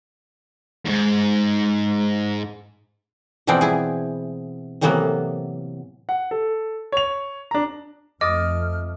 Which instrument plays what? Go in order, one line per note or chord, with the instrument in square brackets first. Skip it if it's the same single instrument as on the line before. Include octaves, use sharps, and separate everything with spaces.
[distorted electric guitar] D#2 G#2
[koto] B2 E3 F3 B3 C4 D5
E4 G#4
A2 C3 E3 F#3 A#3 B3
[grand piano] F#5
A4
C#5 F7
D4 A#5
[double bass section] F2 A3 [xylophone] D#5 [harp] D6 D#6 A6 [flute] F6